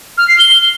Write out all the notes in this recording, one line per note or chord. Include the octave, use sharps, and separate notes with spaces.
F6
C7
G7